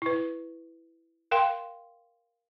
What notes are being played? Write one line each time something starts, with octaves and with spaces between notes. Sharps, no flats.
E4 B4
A#4 F5 G5 C6